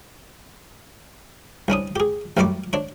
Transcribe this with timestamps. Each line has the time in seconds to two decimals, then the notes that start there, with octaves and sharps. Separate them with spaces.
1.68 C2 C#4 D4 D#6
1.96 G4 G#4
2.37 A1 F#2 G3 D5 C#6 D6
2.73 D4 C#5